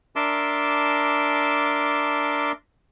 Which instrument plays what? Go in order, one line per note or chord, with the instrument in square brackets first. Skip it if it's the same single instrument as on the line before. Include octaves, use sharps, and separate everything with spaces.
[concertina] D4 A#4 E5 A5 C6 D6